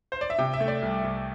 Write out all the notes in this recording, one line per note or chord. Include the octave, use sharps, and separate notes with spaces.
C5
D5
E5
C3 G5
E5
A3
D5
C2
C2